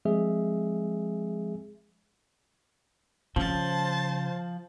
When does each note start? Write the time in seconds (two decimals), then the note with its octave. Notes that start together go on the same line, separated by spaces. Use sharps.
0.05 F3 G#3 C4 G#4 E5
3.36 C#3 F3 C5 A5